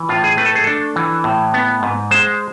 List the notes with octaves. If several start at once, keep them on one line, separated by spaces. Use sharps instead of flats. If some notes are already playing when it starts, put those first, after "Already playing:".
Already playing: E3
A2 F4
G#4
A3 B4
A4
G#4
D4 A4
E3
A2
B3
G#2
G#3 C5